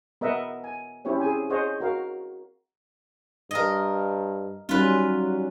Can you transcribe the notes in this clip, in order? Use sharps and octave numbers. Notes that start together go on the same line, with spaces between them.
B3 A#4 D#5 E5 F#5
G#5
C4 C#4 E4 G4 C#5
G#4 G#5
G#4 C5 C#5 D#5 F#5
F#4 A#4 F5
G2 A#4 D#5
F#3 G3 C#4 D#4 F4 B4